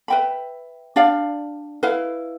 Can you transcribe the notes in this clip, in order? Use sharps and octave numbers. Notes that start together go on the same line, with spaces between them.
B4 E5 G5 B5
D4 G4 D5 F5
E4 B4 F5